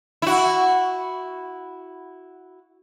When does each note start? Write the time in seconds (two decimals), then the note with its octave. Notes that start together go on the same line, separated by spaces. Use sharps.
0.22 E4 F#4